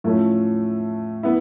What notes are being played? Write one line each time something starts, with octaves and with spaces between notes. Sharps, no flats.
A2 F3 A3 C#4
B3 E4